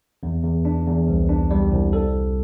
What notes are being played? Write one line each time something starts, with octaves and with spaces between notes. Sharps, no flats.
E2
E2
D4
E2
C2
D4
G3
C2
A4